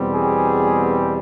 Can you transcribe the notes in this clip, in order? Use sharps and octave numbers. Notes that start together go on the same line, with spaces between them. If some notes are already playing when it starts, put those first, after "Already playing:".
Already playing: E2 B2 G3 C4
G#4